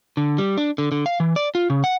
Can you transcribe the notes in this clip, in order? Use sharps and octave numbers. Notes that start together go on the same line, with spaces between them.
D3
G3
D4
D3
D3
F5
E3
D5
F4
C#3
F#5